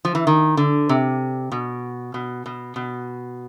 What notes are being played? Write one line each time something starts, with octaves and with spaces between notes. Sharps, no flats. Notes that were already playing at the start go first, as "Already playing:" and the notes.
F3
E3
D#3
D3
C3
B2
B2
B2
B2